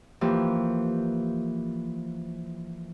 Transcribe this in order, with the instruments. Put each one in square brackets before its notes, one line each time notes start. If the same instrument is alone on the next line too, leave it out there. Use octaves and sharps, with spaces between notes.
[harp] E3 F3 A#3 G4